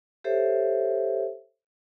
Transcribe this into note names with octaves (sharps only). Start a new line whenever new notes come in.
G4 A4 C5 C#5 E5